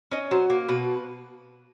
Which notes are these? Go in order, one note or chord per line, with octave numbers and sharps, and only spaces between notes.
C#4 D#5
F#3 C5
A#3
B2 B4